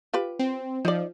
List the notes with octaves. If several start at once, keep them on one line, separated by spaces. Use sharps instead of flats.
F4 G4 B4
C4
F3 D#4 D5